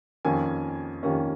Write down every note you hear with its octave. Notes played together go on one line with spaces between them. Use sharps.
F2 D#3 A#3 C#4 G#5
F2 D#3 A#3 C#4